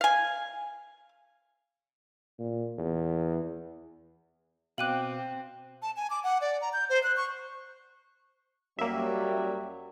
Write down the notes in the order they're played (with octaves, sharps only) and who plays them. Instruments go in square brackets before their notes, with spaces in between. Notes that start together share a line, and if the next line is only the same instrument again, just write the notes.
[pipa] F5 G#5
[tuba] A#2
E2
[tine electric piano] B2 G5 D6 [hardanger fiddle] C4 [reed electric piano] F5 [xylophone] F#6 D#7 F#7
[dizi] A5
G#5
D6
F#5
D5
A#5
G6
C5
F#6
C#6
[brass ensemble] F#2 F#3 G3 [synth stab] A#3 E5